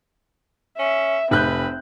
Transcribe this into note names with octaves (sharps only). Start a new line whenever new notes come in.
C#4 E5
F1 C4 B4 F#6 G6